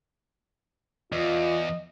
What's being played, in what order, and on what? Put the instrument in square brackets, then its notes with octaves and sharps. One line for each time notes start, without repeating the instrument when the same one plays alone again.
[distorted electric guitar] E2 [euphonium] F4 [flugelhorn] D#5